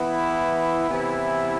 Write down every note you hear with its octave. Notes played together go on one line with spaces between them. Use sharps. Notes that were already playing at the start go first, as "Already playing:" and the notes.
Already playing: E3 B3 E4
C3 E3 B3 E4